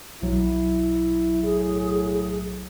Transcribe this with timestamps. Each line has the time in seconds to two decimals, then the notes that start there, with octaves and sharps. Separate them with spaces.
0.22 B1 F#3 E4
1.44 A2 G#4